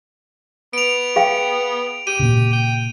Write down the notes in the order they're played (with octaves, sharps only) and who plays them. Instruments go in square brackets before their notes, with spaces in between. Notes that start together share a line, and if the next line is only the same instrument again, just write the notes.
[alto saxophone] B3 [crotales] D7 F7
[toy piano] G#4 F5 G5
[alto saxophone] G4 [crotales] D#7
[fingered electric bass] A#2 C#3
[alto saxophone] G5